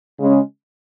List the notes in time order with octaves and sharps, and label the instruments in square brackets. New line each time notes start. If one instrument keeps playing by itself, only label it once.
[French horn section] C#3 G#3 C#4